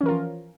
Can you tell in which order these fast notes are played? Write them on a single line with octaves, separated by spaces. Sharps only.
C#4 E3 A#4 F4 F3